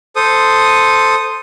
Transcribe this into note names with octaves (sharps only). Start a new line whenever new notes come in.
A4 C5 D#6